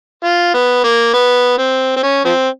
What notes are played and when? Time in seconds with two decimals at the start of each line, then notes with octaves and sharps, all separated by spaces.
0.24 F4
0.54 B3
0.84 A#3
1.14 B3
1.58 C4
1.96 C4
2.03 C#4
2.25 F3 C4